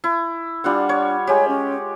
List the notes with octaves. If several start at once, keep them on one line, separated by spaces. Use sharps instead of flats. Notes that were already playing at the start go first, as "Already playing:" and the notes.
E4
G3 D4 F4 F#5
C#5
G#3 G4 C#5
C#4